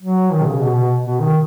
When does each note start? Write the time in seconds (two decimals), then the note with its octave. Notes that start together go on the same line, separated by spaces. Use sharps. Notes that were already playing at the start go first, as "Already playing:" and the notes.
0.02 F#3
0.32 D#3
0.41 B2
0.47 C#3
0.61 B2
0.75 B2
1.05 B2
1.20 D#3